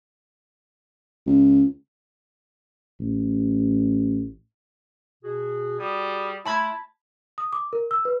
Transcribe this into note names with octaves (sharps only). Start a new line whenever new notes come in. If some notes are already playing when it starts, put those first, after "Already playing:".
C#2
A1
B2 F#4 G#4
G3 F#4 G#4 D#6
A3 E4 F4 A5 B5 G#6
D#6
D6
A#4
E6
B4